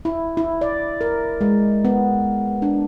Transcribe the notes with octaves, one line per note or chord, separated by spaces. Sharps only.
E4
E4
D5
A#4
G#3
B3
D4